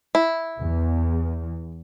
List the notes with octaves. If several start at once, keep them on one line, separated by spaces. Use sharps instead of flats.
E4
E2